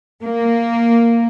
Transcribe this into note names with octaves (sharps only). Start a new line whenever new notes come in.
A#3